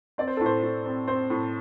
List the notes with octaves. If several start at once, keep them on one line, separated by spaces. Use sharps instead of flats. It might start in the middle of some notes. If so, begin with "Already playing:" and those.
C4 D5
C5
A2 A4
C5
A2
C4
C4 C5
A2